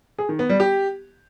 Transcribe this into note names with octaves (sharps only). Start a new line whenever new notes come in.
G#4
D#3
B3
G3
G4